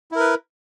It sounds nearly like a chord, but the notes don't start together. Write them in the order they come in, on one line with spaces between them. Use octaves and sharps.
E4 A#4 B4